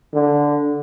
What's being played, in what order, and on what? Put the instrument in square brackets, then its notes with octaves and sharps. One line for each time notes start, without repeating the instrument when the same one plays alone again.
[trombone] D3